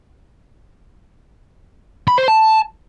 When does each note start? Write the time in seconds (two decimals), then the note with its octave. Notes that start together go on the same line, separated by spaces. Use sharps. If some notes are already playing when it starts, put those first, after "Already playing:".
2.08 B5
2.18 C5
2.28 A5